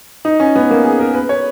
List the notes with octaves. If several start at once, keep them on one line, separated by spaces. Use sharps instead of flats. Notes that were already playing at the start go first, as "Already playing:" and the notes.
D#4
C#4
B3
A#3
G#4
A#4
B4
C#5